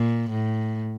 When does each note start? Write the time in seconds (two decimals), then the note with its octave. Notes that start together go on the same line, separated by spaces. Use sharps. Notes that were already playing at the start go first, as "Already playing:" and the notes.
Already playing: A#2
0.31 A2